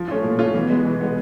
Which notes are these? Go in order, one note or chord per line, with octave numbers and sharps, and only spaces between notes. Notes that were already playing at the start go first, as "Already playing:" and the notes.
Already playing: F3
A3 C#4 F4
A#2 F3
A3 C#4 F4
B2 E3
G#3 B3
E3
G#3 B3